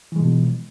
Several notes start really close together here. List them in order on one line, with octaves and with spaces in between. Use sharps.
E3 G#3 B2 F3